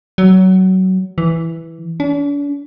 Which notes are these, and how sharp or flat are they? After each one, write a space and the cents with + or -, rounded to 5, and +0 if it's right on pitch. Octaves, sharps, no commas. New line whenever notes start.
F#3 +20
E3 +0
D4 -45